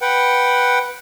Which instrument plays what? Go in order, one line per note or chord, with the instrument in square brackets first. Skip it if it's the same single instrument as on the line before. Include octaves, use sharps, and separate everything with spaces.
[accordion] B4 F#5 G5